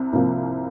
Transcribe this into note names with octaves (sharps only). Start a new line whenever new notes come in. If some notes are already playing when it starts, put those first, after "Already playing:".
Already playing: C2 C3
C2 C3 F3 A#3